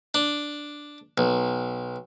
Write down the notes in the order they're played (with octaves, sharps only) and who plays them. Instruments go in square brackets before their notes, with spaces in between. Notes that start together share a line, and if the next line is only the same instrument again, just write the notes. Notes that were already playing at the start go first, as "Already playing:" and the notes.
[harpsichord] D4
B1